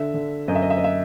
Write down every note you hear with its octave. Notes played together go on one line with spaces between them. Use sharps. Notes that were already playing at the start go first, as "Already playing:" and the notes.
Already playing: D3 E5
D3
F#2 D#5
E5
D#5
E5
D#5
E5